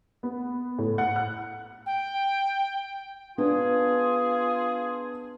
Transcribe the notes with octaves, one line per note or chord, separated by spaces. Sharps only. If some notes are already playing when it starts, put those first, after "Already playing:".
B3
A2
F#5
F#6
G5
B3 D4 F4 G#4